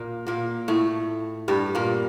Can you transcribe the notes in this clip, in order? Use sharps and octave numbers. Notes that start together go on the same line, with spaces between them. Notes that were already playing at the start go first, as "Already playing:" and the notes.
Already playing: A#2 A#3
A#2 A#3
A2 A3
G2 G3
A#2 A#3